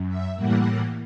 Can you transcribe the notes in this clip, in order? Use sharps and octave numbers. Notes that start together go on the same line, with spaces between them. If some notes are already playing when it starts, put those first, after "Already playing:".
Already playing: F#2
E5
A2 E3 G3 A#3 F#5